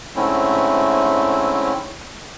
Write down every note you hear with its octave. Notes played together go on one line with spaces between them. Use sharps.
G#2 D3 A3 C4 C#4 E4